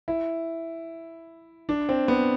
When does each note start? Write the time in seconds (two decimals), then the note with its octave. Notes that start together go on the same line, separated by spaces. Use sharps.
0.08 E4
1.69 D4
1.89 C4
2.08 B3